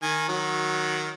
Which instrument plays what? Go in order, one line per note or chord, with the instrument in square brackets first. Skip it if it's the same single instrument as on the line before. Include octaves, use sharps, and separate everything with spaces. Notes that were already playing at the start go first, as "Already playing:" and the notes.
[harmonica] D#3 G#5
D#3 F#3